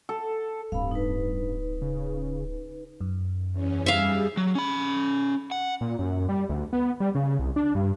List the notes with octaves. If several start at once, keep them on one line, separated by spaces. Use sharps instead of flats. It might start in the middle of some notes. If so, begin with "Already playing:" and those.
A4
D1 G2 C4 F5 B5
D#4 B4
C#3
F#2
E2 C#4
G3 G#4 E5 F5
F#3
C#4 B5
F#5
A#2
F#2
G3
D2
B3
G3
C#3
C2
D4
G2